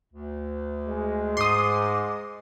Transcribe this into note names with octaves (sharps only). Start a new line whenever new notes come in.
D2
G#3
G#2 C6 D6 D#6